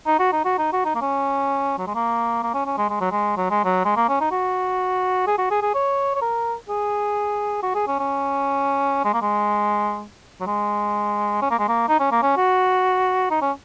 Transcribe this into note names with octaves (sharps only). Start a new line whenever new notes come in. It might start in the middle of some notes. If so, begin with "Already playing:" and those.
D#4
F#4
D#4
F#4
D#4
F#4
D#4
A#3
C#4
F#3
G#3
A#3
A#3
C#4
C#4
G#3
G#3
F#3
G#3
F#3
G#3
F#3
G#3
A#3
C#4
D#4
F#4
G#4
F#4
G#4
G#4
C#5
C#5
A#4
G#4
F#4
G#4
C#4
C#4
G#3
A#3
G#3
F#3
G#3
C#4
A#3
G#3
A#3
D#4
C#4
A#3
C#4
F#4
D#4
C#4